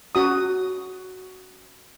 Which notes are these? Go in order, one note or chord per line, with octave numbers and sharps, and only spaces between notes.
C#4 F#4 D#6